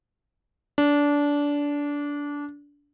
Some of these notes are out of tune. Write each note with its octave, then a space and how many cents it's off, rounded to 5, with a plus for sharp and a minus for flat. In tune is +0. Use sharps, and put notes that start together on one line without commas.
D4 -20